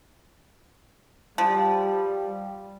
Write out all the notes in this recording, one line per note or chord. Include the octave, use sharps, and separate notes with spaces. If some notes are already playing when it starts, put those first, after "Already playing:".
F3 G3